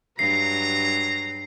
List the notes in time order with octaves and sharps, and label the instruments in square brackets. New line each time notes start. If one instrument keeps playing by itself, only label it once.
[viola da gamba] G2 F#3 [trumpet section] A#5 [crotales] C7